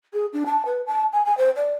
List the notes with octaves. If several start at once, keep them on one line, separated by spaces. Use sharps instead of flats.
G#4
D4
A5
B4
A5
G#5
G#5
C5
D5